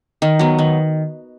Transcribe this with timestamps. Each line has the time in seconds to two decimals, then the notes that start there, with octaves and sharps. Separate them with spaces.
0.22 D#3
0.39 F#3 B3
0.59 D#3